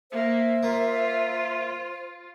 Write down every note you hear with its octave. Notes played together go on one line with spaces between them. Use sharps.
A#3 C5 E5
A#3 F4